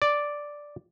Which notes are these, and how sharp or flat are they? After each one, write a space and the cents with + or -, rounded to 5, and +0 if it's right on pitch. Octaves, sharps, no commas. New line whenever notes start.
D5 +0